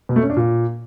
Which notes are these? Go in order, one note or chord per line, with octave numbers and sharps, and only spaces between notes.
B2
A3
C#4
D4
A#2